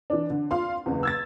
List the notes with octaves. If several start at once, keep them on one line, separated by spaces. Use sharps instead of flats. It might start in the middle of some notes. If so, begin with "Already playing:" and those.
E3 D4
D3
F4 F5 C6
F#1 E2
E6 G#6 A6